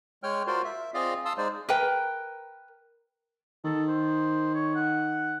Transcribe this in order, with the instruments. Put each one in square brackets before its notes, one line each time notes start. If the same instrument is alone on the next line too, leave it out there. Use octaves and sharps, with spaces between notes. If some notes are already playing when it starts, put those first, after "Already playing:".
[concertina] G#3 C#5 G5 F6
F4 F#4 A#4 C5 D5 C6
E5
C4 F4 G#4 D5 D#5 F5
F5 A5 C6 D#6 E6
G#3 D#4 C5 D5
[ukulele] A#4 B4 G5
[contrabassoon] D#3 [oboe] A4
[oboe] C5
C#5
F#5